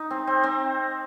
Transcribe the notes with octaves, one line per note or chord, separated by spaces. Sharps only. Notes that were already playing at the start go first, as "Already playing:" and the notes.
Already playing: D#4
C4
C4
C4